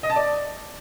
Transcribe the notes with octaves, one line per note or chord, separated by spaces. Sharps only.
D#5
A5
D5